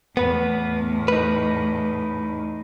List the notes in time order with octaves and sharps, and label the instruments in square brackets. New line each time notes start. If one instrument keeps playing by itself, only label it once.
[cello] E2 A2 [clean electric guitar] B3 B4
[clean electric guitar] D#4 B4